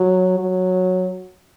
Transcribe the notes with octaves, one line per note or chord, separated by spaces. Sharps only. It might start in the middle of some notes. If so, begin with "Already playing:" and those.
Already playing: F#3
F#3